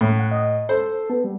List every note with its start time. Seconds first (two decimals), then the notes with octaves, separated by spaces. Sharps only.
0.01 A2
0.18 F#5
0.31 D#5
0.69 A4 C5
1.10 B3
1.24 G3